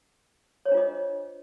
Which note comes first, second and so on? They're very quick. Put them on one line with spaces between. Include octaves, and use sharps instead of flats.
C#5 C5 D4 F4 D#5